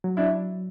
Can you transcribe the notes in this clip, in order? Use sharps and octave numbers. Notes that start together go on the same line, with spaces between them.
F#3
D4 E4